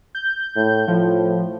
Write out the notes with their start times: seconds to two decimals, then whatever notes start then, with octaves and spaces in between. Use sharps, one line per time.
0.15 G6
0.56 A2
0.88 A2 F3